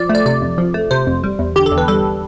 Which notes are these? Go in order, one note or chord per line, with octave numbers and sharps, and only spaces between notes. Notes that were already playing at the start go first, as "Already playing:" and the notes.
Already playing: F3 D5
A3
D5
C3 D5
F2
F3
A3
C3 C5
F2
G3
E2
D3 G4
A4
E2
B4
G3 A4